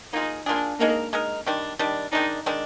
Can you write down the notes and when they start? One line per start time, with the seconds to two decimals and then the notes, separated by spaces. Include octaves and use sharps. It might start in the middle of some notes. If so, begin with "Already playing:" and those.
0.13 A#3 D#4 F4 G#4
0.46 A#3 D4 F4 G#4
0.79 G#3 A#3 D#4 A#4
1.13 G#3 D#4 A#4
1.47 D#3 G3 D4
1.79 D#3 G3 D4
2.12 D#3 G#3 D4 D#4
2.46 D#3 G#3 D4